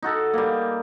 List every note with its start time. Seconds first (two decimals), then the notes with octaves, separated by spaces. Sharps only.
0.02 D#4 F#4 A4
0.34 G3 A#3